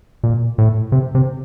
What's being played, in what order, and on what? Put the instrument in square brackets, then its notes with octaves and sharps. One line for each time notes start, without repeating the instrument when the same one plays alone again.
[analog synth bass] A#2
A2
C3
C3